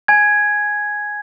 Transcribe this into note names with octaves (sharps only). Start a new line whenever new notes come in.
G#5 G#6